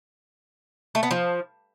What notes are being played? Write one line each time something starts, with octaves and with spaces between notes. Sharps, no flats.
A3
B3
F3